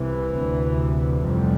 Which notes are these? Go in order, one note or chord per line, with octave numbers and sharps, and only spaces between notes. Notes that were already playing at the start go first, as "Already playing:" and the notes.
Already playing: C2 C3 E3
D2 C3
F1 F2 C3 G3